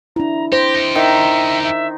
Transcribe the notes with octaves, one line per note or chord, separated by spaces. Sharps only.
D4 E4 A#5
G4 C5 A#6
D#4 G4
D#3 E5
E5